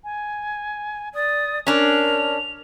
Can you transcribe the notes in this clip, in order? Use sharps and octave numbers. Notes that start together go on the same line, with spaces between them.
G#5
D5 D#6
C#4 D4 A#4 F7